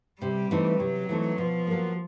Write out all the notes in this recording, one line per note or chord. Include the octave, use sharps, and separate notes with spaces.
C3 G3
E3 A3 C4 D#4
C3 F#3
E3 A3 C4 D#4
B2 F3
F#3 A#3